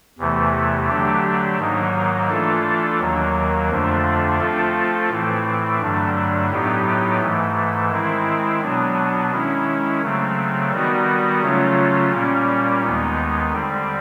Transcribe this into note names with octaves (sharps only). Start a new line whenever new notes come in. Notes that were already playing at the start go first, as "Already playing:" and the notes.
E2 C3 E3 A3
D3 F#3 A3 D4 G4
G#2 D#3 F#3 A#3 D#4
E3 A3 D4 F4 A4
D#2 D#3 F#3 A#3
F2 D3 F3 A3 D4
F3 A3 C4 F4 A4
A2 E3 A3 C4
G2 D3 F#3 A3 D4
A2 F#3 B3 D#4 G4
G#2 E3 A3
D#3 G#3 C4 E4
B2 F#3 B3 D4
D#3 G#3 C#4 E4
C#3 F#3 A3 C4
D#3 G3 B3 D#4 F#4
C#3 F#3 A3 C#4 F4
A#2 G3 A#3 C#4
D#2 D#3 G#3 B3 D#4
D3 G3 C4